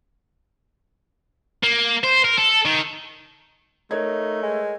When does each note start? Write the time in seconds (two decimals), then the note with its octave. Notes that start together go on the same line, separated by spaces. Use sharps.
1.63 A#3
2.03 C5
2.24 A#4
2.38 A4
2.66 D#3
3.91 A3 D#4 A#4 C#5 G#6
4.43 G#3